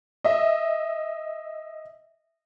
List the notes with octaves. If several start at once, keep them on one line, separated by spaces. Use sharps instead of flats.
D#5 E5